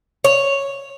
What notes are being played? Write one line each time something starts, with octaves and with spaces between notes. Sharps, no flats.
C#5